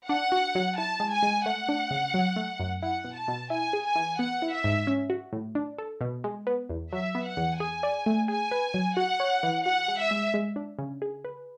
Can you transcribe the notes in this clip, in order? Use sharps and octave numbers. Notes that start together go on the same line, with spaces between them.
D4 F#5
F#4
F#3
E4 A5
G#3
G#5
G#3
A3 F#5
D4
C#3
F#3
A3
F#2
E4 F#5
B2
A5
B2
E4 G#5
G#4
G#5
E3
B3 F#5
E4
E5
G#2
C#4
F#4
A2
D4
A4
B2
G#3
B3
E2
F#3 E5
B3
F#5
E2
G#4 G#5
D5
A3
G#4 G#5
B4
F#3
F#4 F#5
C#5
E3
F#4 F#5
G#3
E5
G#3
G#3
D4
C#3
G#4
B4